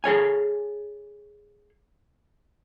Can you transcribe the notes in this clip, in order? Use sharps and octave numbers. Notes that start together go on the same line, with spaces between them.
G#4 A4 C#5 G#5